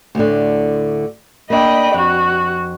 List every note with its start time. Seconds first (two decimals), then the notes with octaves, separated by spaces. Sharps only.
0.15 D2 A2 D3
1.50 A#3 D4 D#5 G5 B5
1.94 F2 F#4